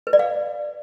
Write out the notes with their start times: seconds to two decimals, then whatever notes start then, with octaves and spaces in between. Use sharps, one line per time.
0.07 B4
0.13 D5
0.19 F5